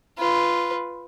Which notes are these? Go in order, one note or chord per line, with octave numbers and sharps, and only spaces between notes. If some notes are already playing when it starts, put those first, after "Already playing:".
F4 B4